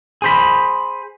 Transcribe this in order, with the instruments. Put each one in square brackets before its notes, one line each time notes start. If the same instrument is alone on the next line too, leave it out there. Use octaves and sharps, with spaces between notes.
[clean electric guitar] G#4 C5 B5